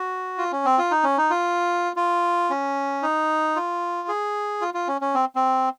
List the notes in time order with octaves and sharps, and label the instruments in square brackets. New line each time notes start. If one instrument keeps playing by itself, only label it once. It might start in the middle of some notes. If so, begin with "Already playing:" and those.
Already playing: [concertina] F#4
F4
C#4
C4
F4
D#4
C#4
D#4
F4
F4
C#4
D#4
F4
G#4
F4
F4
C#4
C#4
C4
C4